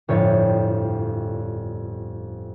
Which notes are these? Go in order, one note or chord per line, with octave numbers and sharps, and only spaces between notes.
G1 F2 A2 C#5 G5 A6